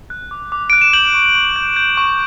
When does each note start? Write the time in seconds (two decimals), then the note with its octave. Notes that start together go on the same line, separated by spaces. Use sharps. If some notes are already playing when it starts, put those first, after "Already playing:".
0.10 F#6
0.31 D6
0.52 D6
0.70 F#6 D7
0.81 E7
0.93 G6 F#7
1.14 C#6
1.35 C#6
1.56 G6
1.76 G6
1.97 C#6